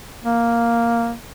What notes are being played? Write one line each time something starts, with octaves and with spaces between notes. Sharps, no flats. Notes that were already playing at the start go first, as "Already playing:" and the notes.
A#3